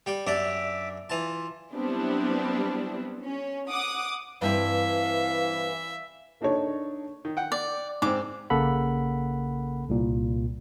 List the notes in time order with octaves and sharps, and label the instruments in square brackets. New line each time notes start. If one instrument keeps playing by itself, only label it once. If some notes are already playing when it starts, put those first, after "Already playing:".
[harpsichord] G3 G5
[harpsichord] F#2 D4 D5 [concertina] E5 D6
[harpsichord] E3 A5 [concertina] F4
[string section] F#3 G3 B3 C4 D4 E4
C#4
F#5 D6 D#6
[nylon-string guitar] G2 C4 E4 [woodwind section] E3 [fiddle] E5 [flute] F5
[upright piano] A#3 D4 D#4 A4 C#5
[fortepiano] D#3
F#5 G5
[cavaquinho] D5
[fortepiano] G#2 C4 [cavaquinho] D6
[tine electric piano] A#1 C#3 A#3 A4 F#5 B5
C2 A#2